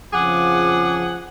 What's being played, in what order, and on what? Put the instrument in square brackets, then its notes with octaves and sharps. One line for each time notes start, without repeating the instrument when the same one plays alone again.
[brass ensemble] F2 C#3 F3 [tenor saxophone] G#4 [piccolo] F#5 [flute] D6